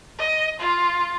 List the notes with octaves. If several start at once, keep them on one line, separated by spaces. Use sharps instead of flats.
D#5
F4